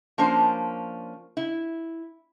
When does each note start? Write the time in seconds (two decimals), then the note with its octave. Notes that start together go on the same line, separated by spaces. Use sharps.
0.18 F3 A#3 C#4 D4 C5
1.37 E4